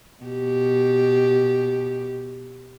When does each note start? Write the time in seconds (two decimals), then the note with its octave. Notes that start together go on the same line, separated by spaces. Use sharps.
0.24 B2 G4